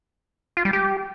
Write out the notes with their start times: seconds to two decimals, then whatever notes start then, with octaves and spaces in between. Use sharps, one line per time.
0.57 F4
0.65 G3
0.73 G4